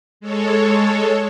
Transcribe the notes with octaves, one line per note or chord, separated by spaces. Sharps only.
G#3 A4 C#5